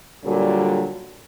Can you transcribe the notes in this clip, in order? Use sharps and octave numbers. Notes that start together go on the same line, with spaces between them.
A#2 D3 F#3 G3